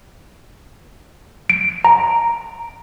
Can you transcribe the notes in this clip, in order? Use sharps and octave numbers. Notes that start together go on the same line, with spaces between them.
D7
A#5